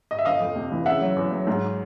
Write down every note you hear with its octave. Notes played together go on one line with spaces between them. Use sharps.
D#5
E5
G1 D#5 F5
F2
C3
E3
C#3 E5 F#5
F#3
E2
F#3
G#2